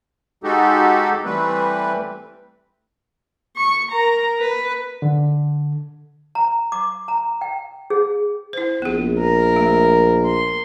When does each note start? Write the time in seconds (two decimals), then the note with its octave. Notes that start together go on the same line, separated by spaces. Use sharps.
0.44 G#3 D#4 F#4 G4 A4
1.25 E3 G3 A3 C4 B4
3.56 C#6
3.91 A#4 A#5
4.40 B4
5.02 D3
6.35 A#5
6.72 D6
7.08 A#5
7.41 G5
7.90 G#4
8.53 E4 C5
8.82 A#1 B3 G#4
9.19 A#4
9.56 A3
10.26 C6